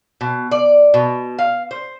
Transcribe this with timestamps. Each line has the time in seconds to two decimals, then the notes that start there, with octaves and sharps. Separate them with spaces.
0.21 B2
0.51 D5
0.94 B2
1.38 F5
1.71 C5